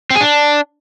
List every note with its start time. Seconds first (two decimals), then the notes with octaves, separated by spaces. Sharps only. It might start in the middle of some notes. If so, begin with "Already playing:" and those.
0.10 C4
0.16 G#4
0.21 D4